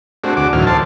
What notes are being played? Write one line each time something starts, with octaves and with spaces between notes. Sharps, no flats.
G#3 A3 C4 D4 F#4
D2 F#4 D5 D6
D2 A2 D#3 E3 F#3 F6
A4 C5 D5 A5